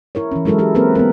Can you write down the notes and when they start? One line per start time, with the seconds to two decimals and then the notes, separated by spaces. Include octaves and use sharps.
0.15 E4 A#4 C#5
0.31 E3 C#4
0.45 F#3 G#3 E4 A4 A#4
0.59 E4 G4 A4
0.75 A#3 C4 E4 A#4 B4
0.95 B3 A#4